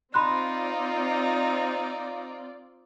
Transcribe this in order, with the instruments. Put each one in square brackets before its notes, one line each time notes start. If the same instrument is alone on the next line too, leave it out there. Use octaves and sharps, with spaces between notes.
[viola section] C4 F4 D5 [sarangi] D#4 [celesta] B5 C6 F#6